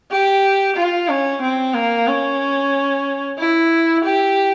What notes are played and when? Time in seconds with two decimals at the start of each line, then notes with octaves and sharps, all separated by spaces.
0.11 G4
0.76 F4
1.09 C#4
1.42 C4
1.74 A#3
2.07 C#4
3.38 E4
4.04 G4